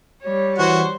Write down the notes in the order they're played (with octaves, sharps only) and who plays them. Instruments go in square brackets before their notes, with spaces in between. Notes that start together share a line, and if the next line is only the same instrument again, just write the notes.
[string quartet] G3 C#5
[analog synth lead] E3 [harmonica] F#4 [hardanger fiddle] C5